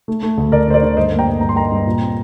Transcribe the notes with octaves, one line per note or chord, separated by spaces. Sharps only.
A3
A3
D2
D2 A#4 D5
D2 C5
A#4 D5
D3
G2 C5 D#5
A#3
G5 A#5
G2
G2 A#5
C6
A#3 G5 A#5
G2
A#2
C4